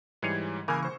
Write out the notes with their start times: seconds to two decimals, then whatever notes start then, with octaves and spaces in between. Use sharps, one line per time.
0.22 G#2 E3 G3 G#4 C#5
0.68 C#3 E3 A#3 A#4 G#5
0.83 C5 C#6